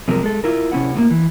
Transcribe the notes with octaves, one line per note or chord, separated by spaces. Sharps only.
F#2 C3 F3 G#3 A#4
G#3 A4
E4 F4 A#4
C3 C#4 E4 F#5
A2 D3 A#3
E3